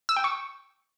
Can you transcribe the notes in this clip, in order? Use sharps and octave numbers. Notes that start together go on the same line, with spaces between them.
E6
G5
C#6